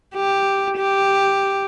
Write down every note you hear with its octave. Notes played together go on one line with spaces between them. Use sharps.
G4
G4